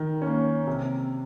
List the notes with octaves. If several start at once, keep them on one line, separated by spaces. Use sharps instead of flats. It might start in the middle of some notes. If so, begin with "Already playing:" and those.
Already playing: D#3
A#3 C#4
C3